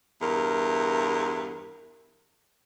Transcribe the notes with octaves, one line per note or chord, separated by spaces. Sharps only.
E2 G2 A#4